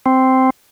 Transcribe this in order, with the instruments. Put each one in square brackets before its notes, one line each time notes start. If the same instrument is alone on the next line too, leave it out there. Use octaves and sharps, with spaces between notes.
[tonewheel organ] C4